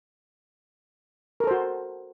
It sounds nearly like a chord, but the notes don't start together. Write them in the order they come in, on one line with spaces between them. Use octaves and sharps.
A#4 A4 C5 F#4